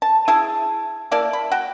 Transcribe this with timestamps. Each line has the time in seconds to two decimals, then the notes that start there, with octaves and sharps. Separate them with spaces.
0.02 A5
0.28 E4 G#4 A5
1.11 A#3 E4 D5 A5
1.33 B5
1.52 F#4 G5